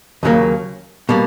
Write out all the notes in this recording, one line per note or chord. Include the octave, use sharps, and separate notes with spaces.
D#2 C#3 F#3 A#3
B2 G3 A#3